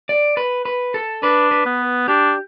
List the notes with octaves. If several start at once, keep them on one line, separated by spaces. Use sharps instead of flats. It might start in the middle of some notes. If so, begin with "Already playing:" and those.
D5
B4
B4
A4
D4 B4
B4
B3
D4 G4